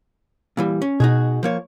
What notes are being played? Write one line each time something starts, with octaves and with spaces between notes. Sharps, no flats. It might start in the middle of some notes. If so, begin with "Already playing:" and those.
A#2 E3 G3
C#4
B2 D#4 F#4 G#4
F3 A#3 C#5